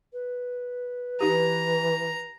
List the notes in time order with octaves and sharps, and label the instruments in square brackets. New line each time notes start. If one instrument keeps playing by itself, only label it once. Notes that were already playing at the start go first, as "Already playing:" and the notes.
[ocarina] B4
[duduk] E3 [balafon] D#4 G4 [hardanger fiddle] A#5